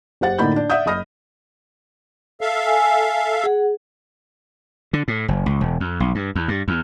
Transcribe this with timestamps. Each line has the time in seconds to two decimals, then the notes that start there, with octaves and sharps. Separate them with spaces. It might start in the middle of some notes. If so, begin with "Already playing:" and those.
0.21 F#1 G4 C5 F#5 A6
0.39 A2 D3 A#3 D#4 B5 G6
0.56 D4
0.70 D5 E5 F#5 D#6 G6
0.86 F#1 D#5 B5 D#6 F6 A#6
2.41 A4 E5 F5
2.67 G#5
3.44 G#4 F#5
4.93 D3
5.08 A2
5.28 F#1
5.46 C#2
5.61 E1
5.80 F2
6.00 B1
6.15 G2
6.35 E2
6.48 G2
6.68 E2